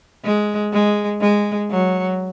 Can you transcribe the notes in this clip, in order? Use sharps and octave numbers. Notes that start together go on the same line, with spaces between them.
G#3
G#3
G#3
F#3